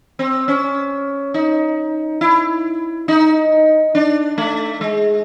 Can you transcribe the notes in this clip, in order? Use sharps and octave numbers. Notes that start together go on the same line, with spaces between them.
C4
C#4
D#4
E4
D#4
D4
A3
G#3